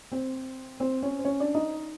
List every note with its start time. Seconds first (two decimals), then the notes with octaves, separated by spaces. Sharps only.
0.12 C4 C5
0.80 C4 C5
1.02 C#4 C#5
1.19 C5
1.25 C#4 C#5
1.40 D4 D5
1.55 D#4 D#5